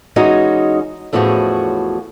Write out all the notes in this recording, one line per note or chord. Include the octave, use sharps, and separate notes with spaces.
E3 G#3 C#4 D#4 F#4 D#5
E2 A2 F3 C#4 F#4 G#4